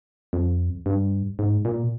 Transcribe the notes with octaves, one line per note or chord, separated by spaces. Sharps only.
F2
G2
G#2
A#2